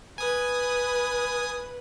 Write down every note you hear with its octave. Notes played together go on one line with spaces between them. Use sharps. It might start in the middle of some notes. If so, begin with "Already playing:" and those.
B4 G#5 D#6